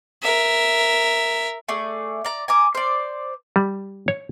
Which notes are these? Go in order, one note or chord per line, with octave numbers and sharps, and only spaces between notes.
A#4 E5
A3 G#4 D5
D5 A#5
G#5 A#5 D6
C5 D5
G3
C#5